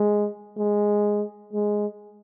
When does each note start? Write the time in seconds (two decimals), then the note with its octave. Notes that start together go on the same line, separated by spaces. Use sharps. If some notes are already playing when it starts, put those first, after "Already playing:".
Already playing: G#3
0.58 G#3
1.53 G#3